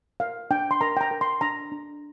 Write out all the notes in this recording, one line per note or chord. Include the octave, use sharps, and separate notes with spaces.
A#4 F5
D4 G5
C6
A#4 A#5
G5
A#5
A#4
C6
D4 A#5
D4